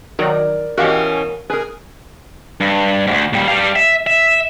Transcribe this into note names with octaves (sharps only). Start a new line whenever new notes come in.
D#3 F#3 A#4 D5
B2 E3 C#4 F#4 G4 A#4 F5 F#5
G#4 A#4 B4
G2
D2 G#2
A#2 G3
G3 F5
E5
E5